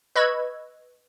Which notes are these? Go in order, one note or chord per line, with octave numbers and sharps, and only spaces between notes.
B4 D#5 B5 C#6 E6 G#6